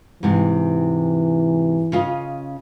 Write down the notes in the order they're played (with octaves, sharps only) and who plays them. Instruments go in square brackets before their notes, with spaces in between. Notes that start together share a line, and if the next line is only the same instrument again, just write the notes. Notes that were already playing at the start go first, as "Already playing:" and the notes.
[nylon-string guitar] G#2 C3 [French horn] E3
[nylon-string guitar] C#3 F4 D#5